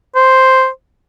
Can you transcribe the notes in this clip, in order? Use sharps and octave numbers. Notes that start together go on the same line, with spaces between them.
C5